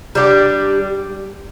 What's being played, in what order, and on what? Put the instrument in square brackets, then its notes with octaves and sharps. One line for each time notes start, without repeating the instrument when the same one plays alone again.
[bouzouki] G3 D4 G4